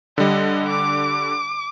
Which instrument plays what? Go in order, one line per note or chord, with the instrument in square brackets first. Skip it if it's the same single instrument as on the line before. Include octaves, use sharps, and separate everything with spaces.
[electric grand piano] D3 G3 [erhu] D#5
[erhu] D6